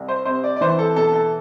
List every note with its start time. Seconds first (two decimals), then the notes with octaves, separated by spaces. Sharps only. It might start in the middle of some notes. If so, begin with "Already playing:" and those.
Already playing: C2
0.08 C5
0.25 C3 C5
0.44 D5
0.56 D5
0.61 E3 C5
0.79 A4
0.96 B2 A4
1.13 A4